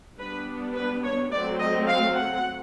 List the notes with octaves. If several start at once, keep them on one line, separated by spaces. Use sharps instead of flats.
G3 B3 D4 B4
B4
C#5
F#3 A3 C4 D5
D#5
F5
F#5